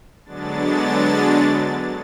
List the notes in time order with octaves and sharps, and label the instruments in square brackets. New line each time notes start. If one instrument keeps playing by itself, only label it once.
[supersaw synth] D3 F#3 G#3 B3 D4 A6